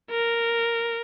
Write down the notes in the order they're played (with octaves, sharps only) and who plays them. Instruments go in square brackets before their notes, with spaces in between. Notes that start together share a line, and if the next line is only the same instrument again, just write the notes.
[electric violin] A#4